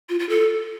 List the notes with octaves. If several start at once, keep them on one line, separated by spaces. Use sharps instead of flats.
F4
F4
A4